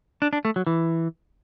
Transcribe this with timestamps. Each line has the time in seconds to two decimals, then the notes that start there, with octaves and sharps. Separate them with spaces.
0.22 D4
0.33 D4
0.45 A3
0.56 F#3
0.67 E3